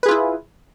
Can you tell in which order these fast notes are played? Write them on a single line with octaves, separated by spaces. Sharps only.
B4 G#4 F4 E4